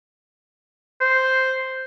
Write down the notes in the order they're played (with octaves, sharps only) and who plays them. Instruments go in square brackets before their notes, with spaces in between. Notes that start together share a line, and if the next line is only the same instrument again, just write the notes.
[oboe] C5